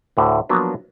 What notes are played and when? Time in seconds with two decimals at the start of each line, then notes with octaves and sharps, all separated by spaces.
0.17 D2 A2 D3
0.49 F3 F#3 A#3 B3 D4